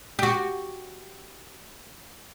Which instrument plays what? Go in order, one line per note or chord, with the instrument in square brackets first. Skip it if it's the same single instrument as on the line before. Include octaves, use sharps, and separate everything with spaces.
[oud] F#4 G4